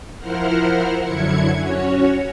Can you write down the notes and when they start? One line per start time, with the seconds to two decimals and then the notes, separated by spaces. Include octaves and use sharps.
0.18 F3 E4 A#4 C5 F#5 F6
1.03 F#2 D3 F#3 E4 G#6 C#7
1.52 C#4 F#4 C#5